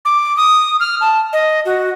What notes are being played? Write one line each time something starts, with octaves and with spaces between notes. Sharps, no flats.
D6
D#6
F6
A5
D#5
F#4